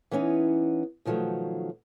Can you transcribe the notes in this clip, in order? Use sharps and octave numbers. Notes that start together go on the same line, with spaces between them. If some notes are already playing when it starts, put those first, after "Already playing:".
E3 B3 C#4 D#4
B2 D#3 F3 F#3 A3